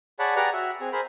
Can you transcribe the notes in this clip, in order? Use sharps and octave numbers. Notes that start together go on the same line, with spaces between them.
G#4 C#5 D5 F#5 A5 B5
G4 G#4 B4 D5 F#5 A#5
F#4 E5
C4 G#4
G#4 A#4 C5 B5